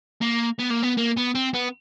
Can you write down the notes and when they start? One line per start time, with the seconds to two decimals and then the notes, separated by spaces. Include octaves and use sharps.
0.21 A#3
0.59 B3
0.71 A#3
0.83 B3
0.97 A#3
1.17 B3
1.35 C4
1.54 B3